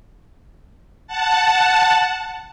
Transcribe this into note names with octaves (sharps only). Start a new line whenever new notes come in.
F#5 A5